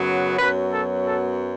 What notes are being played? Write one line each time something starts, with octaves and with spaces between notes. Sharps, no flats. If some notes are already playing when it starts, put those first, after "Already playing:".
Already playing: F#2 C#3 F#3 B3
F#2 F#3 B3 B4
A4
A4